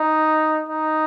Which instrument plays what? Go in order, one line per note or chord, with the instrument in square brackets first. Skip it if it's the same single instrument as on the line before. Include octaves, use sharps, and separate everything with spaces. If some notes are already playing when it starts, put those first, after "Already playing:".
Already playing: [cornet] D#4
D#4